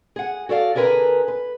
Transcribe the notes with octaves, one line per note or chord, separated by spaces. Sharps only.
G#4 F#5
F#4 A4 D5 F5
D3 G#4 A#4 B4 G#5 A#5
B4